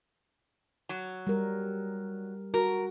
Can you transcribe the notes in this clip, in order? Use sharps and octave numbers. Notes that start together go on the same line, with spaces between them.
F#3
G3 A#4
F#4 A#4